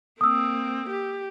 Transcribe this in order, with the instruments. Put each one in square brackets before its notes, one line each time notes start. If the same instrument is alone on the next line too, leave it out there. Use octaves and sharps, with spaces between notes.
[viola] A#3 C4 [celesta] D#6 E6
[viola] G4